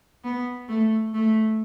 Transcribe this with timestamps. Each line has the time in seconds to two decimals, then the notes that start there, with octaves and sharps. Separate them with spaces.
0.24 B3
0.68 A3
1.14 A3